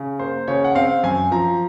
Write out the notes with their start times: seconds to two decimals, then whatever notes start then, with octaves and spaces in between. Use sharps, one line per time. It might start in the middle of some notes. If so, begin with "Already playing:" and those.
Already playing: C#3
0.19 A#3 C5
0.48 C#3 C#5
0.64 F#5
0.75 C4 F5
1.03 F#2 G#5
1.31 F3 A#5